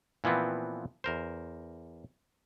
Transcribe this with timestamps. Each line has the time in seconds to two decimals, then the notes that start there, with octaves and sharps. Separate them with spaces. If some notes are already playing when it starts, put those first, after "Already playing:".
0.24 A#2 E3 F3 B3 C4
1.04 E2 A#4 C5